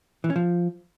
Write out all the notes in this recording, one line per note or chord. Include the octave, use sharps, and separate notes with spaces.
E3
C#4
F3